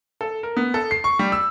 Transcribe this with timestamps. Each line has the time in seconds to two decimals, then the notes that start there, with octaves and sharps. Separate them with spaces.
0.21 A4
0.43 A#4
0.57 B3
0.74 A4
0.91 C7
1.04 C#6
1.19 G3
1.32 E6